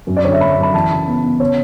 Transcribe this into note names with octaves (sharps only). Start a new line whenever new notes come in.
F#2
D5
D3 C#5
E5
F#2 B5
F#2
B5
E3 A5
C#3
B3
B3
C#3 C#5